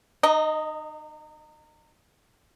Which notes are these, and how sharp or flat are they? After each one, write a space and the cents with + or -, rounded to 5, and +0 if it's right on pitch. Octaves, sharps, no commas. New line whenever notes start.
D#4 -30 D#5 +0 A#5 +0